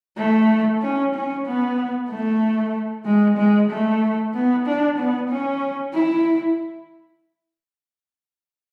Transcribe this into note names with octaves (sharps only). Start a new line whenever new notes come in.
A3
C#4
C#4
B3
A3
G#3
G#3
A3
B3
D4
B3
C#4
E4